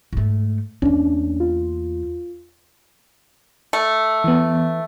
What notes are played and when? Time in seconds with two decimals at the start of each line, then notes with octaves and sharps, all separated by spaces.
0.13 G#2 A3
0.82 E2 A#3 C#4 D4
1.40 F4
3.73 A3
4.24 E3 B3